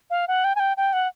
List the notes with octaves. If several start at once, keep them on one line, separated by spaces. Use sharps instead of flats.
F5
F#5
G5
G#5
G5
G5
F#5